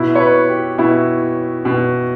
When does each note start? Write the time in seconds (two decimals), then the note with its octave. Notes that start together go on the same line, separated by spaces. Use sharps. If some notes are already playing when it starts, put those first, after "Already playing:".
Already playing: B2 E4
0.15 C#5
0.20 B4
0.49 G4
0.78 B2 E4
1.65 B2